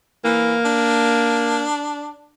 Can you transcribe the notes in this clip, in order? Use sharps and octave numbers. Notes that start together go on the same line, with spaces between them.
E3 A#3
D4